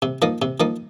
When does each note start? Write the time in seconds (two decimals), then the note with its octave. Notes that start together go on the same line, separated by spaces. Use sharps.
0.02 C3
0.22 F3 A#3 D#4
0.42 C3
0.60 F3 A#3 D#4